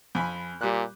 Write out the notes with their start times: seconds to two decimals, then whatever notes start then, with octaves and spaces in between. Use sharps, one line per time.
0.15 F2 G#5 B5
0.61 A#2 G3 F#6